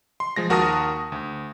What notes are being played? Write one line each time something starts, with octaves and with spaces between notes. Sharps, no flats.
C6
F3 G#3 A#6
D#2 F#4 A#4 A5 D#6 A#6
D2